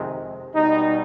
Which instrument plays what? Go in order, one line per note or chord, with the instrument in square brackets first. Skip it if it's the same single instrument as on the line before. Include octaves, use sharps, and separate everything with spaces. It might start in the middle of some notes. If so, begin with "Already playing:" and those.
Already playing: [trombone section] F2 C3 D#3 G#3
B2 G3 D#4